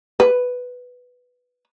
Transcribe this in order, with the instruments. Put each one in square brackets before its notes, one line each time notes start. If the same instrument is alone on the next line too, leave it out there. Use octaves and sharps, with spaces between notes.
[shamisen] B4